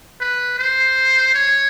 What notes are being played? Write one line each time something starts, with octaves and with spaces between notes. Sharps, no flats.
B4
C5
C#5